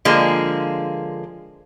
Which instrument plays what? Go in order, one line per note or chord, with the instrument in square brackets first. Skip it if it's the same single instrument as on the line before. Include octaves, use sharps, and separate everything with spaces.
[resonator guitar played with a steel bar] D3 F3 G#3 A#3